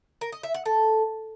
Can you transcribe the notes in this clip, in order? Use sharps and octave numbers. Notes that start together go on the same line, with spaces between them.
A#4
D#5
E5
F#5
A4